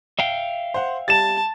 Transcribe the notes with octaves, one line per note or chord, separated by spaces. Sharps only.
E5 F5 G5
C5 F#5
G3 A5 A6 E7